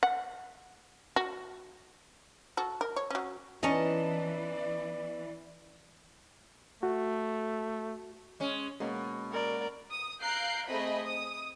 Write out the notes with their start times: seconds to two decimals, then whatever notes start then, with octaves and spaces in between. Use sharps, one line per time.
0.03 F#5
1.16 F#4
2.57 F#4 A4
2.81 A#4
2.96 C#5
3.11 F#3 C#4
3.63 E3 B3 C#4 D#4 D5 D#5 A5
6.83 A3 F#4
8.40 G#3 C#4
8.80 B2 G#3 A#3 C#4
9.31 A#4 D5
9.91 D#6
10.21 F5 A#5 F#6 G6 C7 D7
10.67 A3 C4 G#4 D#5 B5
11.06 D#6